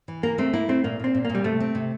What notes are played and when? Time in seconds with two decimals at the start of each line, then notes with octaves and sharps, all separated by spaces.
0.08 E3
0.23 A#3 A#4
0.38 A3 C4
0.53 A#3 E4
0.69 A3 C4
0.84 A#2 A#3
0.99 A#2 C4
1.15 A#2
1.25 A#2 A#3
1.35 G3
1.44 C3 A3
1.60 C4
1.75 C3